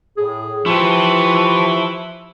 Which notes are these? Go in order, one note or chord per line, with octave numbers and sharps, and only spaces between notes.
A2 G#4
F3 E4 F4 G4 B4 C#6